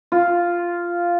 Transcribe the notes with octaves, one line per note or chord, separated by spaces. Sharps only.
F4